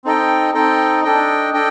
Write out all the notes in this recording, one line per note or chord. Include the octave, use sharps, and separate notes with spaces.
C4 D#4 A4 D#5 G5
C4 D#4 A4 D#5 G5
D4 A4 D#5 G5
D4 A4 D#5 G5